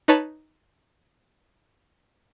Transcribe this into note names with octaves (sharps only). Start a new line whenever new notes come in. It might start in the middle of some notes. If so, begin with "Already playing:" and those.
D#4 B4 C#5 A5 B5